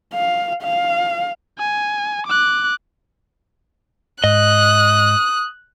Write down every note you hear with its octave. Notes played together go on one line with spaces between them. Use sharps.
F5
F5
G#5
D6 F#6
G#2 D#5 D#6 F#6